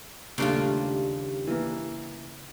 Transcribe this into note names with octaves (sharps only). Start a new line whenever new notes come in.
D#2 A#2 C#3 G3 A3 D4 F4
E3 A#3